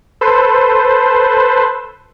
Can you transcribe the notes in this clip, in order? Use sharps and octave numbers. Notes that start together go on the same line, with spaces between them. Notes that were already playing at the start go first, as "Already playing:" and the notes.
A4 B4 C5